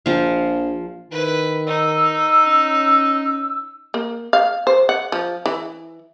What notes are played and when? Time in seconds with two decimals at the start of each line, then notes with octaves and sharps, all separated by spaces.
0.06 A#1 F3 F5
1.11 D#3 E4 B4
1.67 D#4 E6
2.47 C#4
3.94 A#3
4.33 F5
4.67 C5
4.89 F#5
5.12 F3
5.46 E3